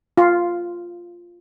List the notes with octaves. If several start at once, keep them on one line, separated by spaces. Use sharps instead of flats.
F4